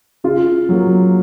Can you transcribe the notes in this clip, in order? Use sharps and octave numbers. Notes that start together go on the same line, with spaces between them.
C#3 F4
F#3 A#3